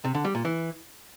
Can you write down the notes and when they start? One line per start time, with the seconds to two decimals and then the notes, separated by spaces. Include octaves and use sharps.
0.04 C3
0.15 D3
0.25 G3
0.35 A#2
0.45 E3